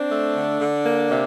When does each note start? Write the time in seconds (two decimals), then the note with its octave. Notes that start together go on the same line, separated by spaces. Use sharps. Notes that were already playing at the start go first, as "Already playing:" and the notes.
Already playing: C4 D4
0.10 A3
0.35 D3
0.60 D3
0.86 A#3
1.10 C3